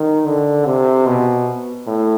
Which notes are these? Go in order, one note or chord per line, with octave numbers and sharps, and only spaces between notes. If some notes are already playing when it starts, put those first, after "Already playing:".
Already playing: D#3
D3
C3
B2
A2